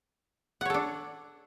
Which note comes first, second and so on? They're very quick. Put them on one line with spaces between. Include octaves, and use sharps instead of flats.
F#5 C#5 A4 D4